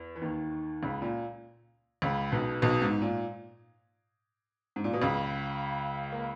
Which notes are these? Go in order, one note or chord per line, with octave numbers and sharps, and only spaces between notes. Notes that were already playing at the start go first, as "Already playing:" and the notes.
Already playing: E2
E3
D#2 D#3
C#2 C#3
A#2
C#2 C#3
B1 B2
B1 B2
G#2
A#2
G#2
A#2
B2
C#2 C#3
A#3